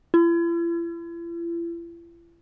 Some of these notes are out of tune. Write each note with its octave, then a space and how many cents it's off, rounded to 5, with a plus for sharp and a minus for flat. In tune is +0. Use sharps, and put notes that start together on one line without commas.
E4 +45